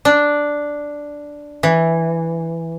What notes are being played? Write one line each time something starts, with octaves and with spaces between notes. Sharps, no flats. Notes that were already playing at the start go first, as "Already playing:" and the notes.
D4
E3